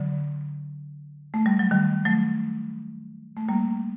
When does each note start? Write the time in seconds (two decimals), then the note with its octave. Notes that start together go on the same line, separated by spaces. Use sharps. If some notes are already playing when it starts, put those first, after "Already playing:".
Already playing: D3 F#3
1.34 A3
1.46 G3
1.59 F#3
1.71 D#3 G3
2.05 F#3 A3
3.37 A3
3.48 G3 A#3